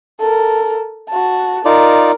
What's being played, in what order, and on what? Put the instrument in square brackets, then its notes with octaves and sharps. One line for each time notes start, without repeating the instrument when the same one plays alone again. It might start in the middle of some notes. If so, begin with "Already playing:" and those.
[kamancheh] A4 A#4
F#4 A5
[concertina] D#4 F4 D5 [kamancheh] A#4